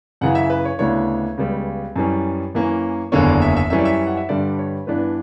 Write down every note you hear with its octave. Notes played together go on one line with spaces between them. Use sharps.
F#2 C#3 E3 F#5
E5
B4
C#5
D2 C#3 E3 B3 D4 C#5
C#2 C#3 G3 B3
F#2 E3 G3 C#4
F#2 E3 A#3 C#4
F#1 E2 D3 A#3 C#4 C#5
D5
E5
E5
F#2 E3 G3 C#4 E5
D5
E5
F#5
E5
G2 D3 G3 D5
C#5
G2 E3 B3 D4 B4